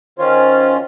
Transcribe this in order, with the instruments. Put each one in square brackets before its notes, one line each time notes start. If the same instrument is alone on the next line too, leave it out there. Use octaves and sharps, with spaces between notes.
[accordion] D#3 C#4 F4 [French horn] C5